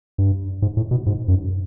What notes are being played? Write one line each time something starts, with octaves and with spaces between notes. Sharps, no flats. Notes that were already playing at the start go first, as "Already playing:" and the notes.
G2
G#2
A2
B2
G#2
F#2